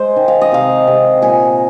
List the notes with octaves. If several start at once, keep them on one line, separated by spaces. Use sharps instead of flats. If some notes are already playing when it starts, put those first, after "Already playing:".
Already playing: G#3 C5
D#3
F5
D#5
C3 F5
C3
A#2 G#5